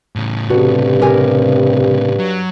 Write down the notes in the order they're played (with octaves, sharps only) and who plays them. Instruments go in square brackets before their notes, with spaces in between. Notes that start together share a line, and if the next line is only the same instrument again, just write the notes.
[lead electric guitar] A2 C#3
[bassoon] G2 [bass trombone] C3 [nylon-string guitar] F#4 A4
[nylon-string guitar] G4 A#4 G#5
[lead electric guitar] F#3